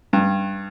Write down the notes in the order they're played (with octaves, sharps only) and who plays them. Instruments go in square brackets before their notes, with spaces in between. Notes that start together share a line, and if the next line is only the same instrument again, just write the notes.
[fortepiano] G2